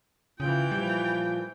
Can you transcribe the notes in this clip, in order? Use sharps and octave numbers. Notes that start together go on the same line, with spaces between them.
C#3 E3 F4 G5
A#2 F3 G3